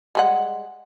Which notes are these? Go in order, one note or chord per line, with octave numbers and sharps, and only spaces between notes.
G3 G#3 F#5